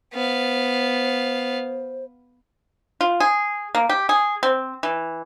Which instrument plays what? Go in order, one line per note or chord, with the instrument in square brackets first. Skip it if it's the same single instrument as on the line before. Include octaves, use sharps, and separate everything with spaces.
[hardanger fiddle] B3 F5 [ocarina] C5
[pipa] F4
G#4
A#3
G4
G#4
C4
E3